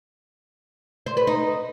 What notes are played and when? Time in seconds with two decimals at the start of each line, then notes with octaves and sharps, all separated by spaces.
1.06 C5
1.17 B4
1.27 D#4